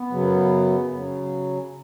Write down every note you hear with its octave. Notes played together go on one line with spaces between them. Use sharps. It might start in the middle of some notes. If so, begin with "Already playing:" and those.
Already playing: B3
F#2 C#3 F#3
C#3 F#3